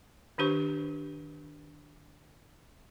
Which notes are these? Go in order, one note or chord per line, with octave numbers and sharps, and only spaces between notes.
D#3 D4 G4 C5 C#6